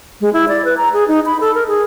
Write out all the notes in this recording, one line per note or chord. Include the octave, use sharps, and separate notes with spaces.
G#3
E4
D5
B4
A#5
G#4
D#4
B5
A4
A#4
G#4